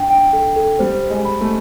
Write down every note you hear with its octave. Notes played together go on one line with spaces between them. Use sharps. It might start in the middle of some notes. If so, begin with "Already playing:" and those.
Already playing: D4 G5
G5
A4
A4
G3 C5
C5
G#3
B5
A3